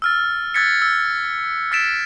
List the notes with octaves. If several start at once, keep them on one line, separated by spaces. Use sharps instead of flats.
E6 F6 A6
E6 F#6 G#6 A6 B6 C#7
E6
E6 A6 B6 D7 E7